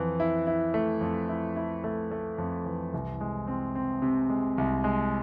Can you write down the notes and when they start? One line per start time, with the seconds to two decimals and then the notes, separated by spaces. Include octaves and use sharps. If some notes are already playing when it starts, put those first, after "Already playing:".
Already playing: F2 E3
0.20 E4
0.47 E4
0.74 A3
1.01 F2
1.29 E4
1.56 E4
1.84 A3
2.11 A3
2.38 F2
2.65 E3
2.94 C2
3.21 G#3
3.47 C4
3.75 C4
4.02 C3
4.30 G#3
4.58 C2
4.84 G#3